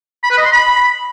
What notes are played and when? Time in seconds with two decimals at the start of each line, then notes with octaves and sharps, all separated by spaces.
0.24 B5
0.31 B4
0.38 D#5
0.45 C6
0.52 B5